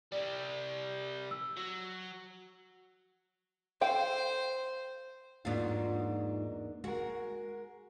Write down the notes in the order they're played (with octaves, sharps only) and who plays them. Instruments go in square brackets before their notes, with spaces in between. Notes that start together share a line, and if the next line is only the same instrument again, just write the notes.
[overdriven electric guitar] C3 G3 [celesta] D5
[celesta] E6
[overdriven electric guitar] F#3
[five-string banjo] A4 F5 G5 [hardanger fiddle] C5
[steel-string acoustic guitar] E2 A#3 D4 [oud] G#2 F#3 F4
[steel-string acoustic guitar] G#3 A#4 [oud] F#4